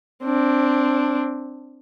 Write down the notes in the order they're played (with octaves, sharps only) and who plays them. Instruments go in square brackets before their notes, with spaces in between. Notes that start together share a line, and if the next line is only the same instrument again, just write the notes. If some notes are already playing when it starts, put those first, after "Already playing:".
[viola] C4 D4